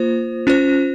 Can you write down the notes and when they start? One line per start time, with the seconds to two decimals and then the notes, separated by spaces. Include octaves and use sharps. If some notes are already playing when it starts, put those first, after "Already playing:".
Already playing: A#3 F4 C5
0.47 C#4 F4 C5